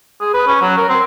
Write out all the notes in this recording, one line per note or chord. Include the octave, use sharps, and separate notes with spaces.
G#4
B4
C#4
F#3
A#4
C4